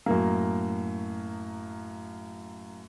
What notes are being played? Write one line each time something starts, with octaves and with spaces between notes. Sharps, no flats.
F#2 A2 A#3